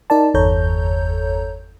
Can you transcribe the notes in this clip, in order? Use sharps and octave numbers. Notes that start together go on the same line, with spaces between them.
D#4 A#4 D5 A5
G1 E2 A4 C#5 A#5 G6